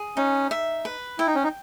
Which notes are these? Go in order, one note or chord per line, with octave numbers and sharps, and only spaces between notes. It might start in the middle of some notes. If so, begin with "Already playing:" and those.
Already playing: G#4
C#4 D#4
E5
B4
E4 G5
D#4
C#4
D#4